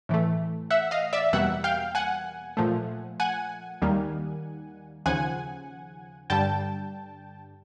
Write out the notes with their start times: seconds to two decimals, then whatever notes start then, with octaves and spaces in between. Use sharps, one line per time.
0.09 A2 E3 A3
0.71 E5 F#5
0.91 D#5 F5
1.13 D5 E5
1.33 E2 B2 G3 A#3 E5 F#5
1.64 F5 G5
1.95 F#5 G#5
2.57 A#2 F3 A3
3.20 F#5 G#5
3.82 D#2 D#3 G3 A#3
5.06 D#2 C#3 F3 F#5 G#5
6.30 G2 D3 G3 G5 A5